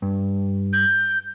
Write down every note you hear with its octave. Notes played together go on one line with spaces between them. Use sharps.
G2
G6